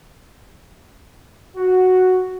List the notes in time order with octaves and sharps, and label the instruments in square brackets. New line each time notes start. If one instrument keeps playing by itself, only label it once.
[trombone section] F#4